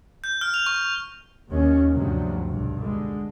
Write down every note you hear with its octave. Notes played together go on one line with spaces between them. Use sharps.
G6
F6
F7
C#6
D#2 C#4
D2 G2 C3 F3 F#3
B1 G2
D3 G#3